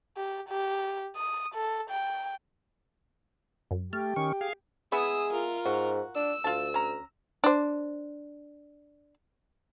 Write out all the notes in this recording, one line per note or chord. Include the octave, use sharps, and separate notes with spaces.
G4
G4
D#6
A4
G5
F#2
A3 G4 F6
D#3 C#4 C#6
G#4 F5
G#3 B3 E4 G#4 D#6 E6
F4 A#4
G#2 F#4
D4 E6
D2 F4 A5
C#4 A#5
D4 C5